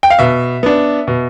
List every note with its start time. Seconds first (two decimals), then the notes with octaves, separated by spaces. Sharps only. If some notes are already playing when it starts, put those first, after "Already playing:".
0.03 G5
0.10 F5
0.19 B2 E5
0.63 B3 D4
1.07 B2